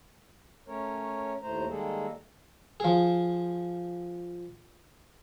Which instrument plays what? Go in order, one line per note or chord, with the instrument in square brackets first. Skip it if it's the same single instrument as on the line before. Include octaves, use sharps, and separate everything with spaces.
[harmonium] A3 C#4 A#4 C#5
D#2 A2 A3 C5 A#5
D#3 G3 G#3 A#3 G#4 A4
[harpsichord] F3 G#4